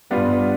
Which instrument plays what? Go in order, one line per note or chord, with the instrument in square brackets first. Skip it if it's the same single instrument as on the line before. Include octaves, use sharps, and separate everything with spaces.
[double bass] G2 [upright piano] G3 B3 D4 F4